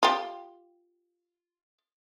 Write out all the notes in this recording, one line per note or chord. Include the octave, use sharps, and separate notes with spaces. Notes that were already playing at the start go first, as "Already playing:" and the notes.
F4 G4